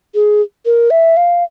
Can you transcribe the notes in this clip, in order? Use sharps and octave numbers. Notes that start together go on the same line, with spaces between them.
G#4
A#4
E5
F5